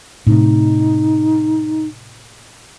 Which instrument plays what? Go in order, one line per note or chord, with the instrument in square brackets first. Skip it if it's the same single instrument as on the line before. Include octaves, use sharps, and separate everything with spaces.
[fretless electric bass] A2 C3 [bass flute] D#4